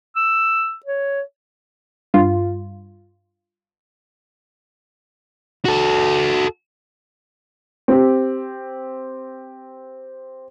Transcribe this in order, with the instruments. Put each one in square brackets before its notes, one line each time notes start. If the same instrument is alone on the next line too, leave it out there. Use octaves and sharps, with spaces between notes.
[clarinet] E6
C#5
[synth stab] G2 F4
[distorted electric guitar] F#4 A4
[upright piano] C4 G4